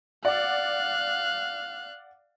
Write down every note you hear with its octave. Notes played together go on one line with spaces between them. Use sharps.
D5 F5 F#5 F#6